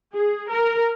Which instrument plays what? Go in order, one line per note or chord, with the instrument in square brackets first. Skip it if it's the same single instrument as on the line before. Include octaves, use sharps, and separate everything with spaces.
[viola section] G#4
A#4